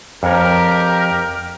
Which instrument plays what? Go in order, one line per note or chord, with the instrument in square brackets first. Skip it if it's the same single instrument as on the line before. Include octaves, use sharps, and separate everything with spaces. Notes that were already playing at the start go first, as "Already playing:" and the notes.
[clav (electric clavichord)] F2 C#5 [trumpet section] G4 A#4